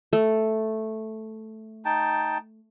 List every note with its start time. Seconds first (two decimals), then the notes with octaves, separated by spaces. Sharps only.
0.13 A3
1.85 D#4 G5 A5